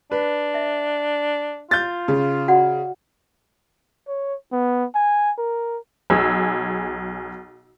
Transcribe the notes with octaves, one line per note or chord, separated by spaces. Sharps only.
D4 B4
E5
F4 G6 A6
C#3
F#4 D5 F#5
C#5
B3
G#5
A#4
B1 G#4 E6